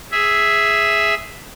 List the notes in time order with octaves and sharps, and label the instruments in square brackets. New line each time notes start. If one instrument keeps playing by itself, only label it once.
[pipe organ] G#4 E5